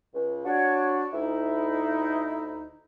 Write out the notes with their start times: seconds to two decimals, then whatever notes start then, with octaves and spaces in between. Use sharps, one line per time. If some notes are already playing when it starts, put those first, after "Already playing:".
0.14 C#2
0.45 D4 F#4 C#5
1.13 D2 D#4 E4